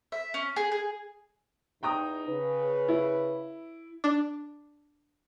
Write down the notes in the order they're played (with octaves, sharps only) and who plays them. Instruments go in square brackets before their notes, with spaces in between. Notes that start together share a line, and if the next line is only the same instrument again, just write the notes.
[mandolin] E5
C#4
G#4
G#4
[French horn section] E2 D#4 [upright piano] G5 A#5 D#6
[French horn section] C#3 B4
[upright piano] E4
[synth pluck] D4